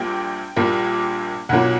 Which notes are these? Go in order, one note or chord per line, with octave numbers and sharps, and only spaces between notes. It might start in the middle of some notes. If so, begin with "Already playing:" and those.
Already playing: A#1 A#2 G3 A#3 G5
A#1 A#2 G3 A#3
B1 A#2 F#3 A#3 F#5